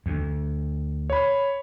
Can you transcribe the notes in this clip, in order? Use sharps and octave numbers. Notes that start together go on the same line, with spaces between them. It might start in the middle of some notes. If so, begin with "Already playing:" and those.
D2
C#5 B5